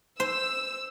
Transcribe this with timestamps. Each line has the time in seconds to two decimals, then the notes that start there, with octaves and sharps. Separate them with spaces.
0.20 C5 E6